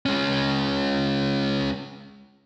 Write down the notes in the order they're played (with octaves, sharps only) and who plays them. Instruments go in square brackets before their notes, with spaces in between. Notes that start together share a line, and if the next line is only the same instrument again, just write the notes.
[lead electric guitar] G#3 C#4